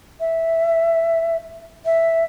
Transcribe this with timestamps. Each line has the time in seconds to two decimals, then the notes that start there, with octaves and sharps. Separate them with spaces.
0.20 E5
1.85 E5